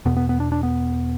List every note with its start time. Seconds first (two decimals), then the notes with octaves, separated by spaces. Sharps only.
0.06 E2 B2 B3
0.17 B3
0.29 B3
0.40 D4
0.52 D4
0.63 B3